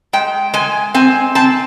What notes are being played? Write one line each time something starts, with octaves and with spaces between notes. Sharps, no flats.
G#3 G5
G#3 G#5
C4 G#5
C4 A5